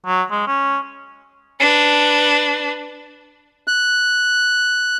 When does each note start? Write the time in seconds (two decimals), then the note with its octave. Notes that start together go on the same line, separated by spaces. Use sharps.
0.06 F#3
0.31 G#3
0.47 C#4
1.60 D4 B4
3.67 F#6